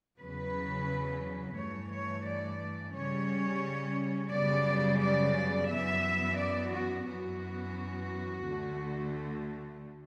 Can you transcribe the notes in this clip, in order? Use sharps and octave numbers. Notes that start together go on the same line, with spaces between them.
E2 C#3 F#3 B4
G2 E3 A3 C#5
C#5
D5
C#3 G3 C#4 C#5
F#2 C#3 G3 B3 D5
D5
F#2 E3 B3 E5
D5
F#4
F#2 E3 B3 F#4
D2 D3 A3